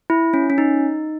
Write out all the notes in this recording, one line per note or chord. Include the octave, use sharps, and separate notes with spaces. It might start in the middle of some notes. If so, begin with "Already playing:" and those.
E4
C#4
C#4
D#4